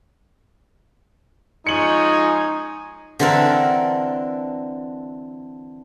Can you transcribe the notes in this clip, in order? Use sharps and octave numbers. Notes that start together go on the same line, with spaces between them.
F3 G#3 C#4 D#4 G#5 C#7 F#7
D3 E3 C4 A4 A#4